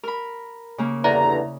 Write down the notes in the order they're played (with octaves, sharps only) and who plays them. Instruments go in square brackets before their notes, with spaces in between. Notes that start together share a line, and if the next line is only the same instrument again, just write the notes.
[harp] A#4 B5
C#3 A#3
[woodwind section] E2 G2 D3 [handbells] E4 D5 E5 [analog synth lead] A#5